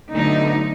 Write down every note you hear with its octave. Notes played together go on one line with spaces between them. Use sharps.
D2 D3 F#3 B3 D#4